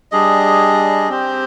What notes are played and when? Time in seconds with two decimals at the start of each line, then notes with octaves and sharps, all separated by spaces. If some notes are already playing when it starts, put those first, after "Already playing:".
0.12 G3 D4 G#4 D#5
1.09 C4 G4 C5